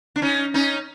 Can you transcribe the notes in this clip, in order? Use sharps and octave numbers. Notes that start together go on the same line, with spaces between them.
D4
C#4 D#4
C#4 D#4